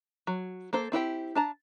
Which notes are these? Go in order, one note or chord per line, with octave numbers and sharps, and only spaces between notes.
F#3
A#3 A4 C5
C4 E4 G4 G5
D4 A5 A#5